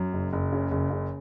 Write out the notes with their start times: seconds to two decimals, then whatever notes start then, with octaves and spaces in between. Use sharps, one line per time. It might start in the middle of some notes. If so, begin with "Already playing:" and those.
Already playing: F#2
0.13 F#1
0.33 F#1
0.52 C#3
0.71 F#1
0.90 C#3